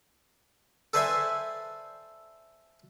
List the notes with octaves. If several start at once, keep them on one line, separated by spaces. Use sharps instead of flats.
A4 B4 C5 D5 E5 G#5